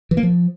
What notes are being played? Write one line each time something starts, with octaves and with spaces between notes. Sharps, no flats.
E3
A#3
F3